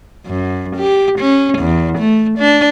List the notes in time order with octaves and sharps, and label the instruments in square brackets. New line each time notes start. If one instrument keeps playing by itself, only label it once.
[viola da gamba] F#2
G4
C#4
E2
A3
D4